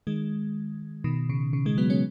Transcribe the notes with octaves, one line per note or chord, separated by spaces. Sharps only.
D#3 G#3
B2 D#3
C#3
C#3
D#3 G#3
F#3 B3
G#3 C#4